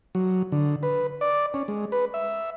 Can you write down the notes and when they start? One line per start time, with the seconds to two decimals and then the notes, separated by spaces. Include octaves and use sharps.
0.15 F#3
0.52 D3
0.83 B4
1.21 D5
1.54 C#4
1.68 G#3
1.92 B4
2.14 E5